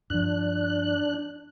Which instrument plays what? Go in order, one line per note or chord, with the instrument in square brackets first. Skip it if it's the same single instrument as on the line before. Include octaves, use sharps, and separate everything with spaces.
[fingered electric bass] G2 F3 [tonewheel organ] D4 F#6